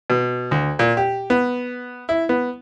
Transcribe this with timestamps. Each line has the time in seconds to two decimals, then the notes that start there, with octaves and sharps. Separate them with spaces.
0.10 B2
0.51 D2
0.79 A#2
0.97 G4
1.30 B3
2.09 E4
2.29 B3